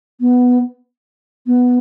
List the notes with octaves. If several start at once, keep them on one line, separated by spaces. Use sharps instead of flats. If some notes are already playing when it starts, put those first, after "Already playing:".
B3
B3